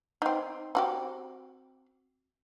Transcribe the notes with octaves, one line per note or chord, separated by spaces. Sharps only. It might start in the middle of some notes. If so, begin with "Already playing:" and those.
C4 D#4
C4 F#4 G4